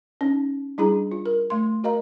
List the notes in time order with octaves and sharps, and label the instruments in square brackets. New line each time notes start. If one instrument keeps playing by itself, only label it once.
[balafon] C#4 D#4
G3 D4 E4 G#4 A#5
F4
A#4
A3 C6
F#4 A#4 D#5 F5 A#5